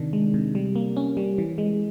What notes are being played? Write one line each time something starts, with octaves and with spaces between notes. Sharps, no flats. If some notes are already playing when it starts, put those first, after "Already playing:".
Already playing: C3 D#3 D4
G#3
C3
G3
A#3
C#4
G3
E3
G#3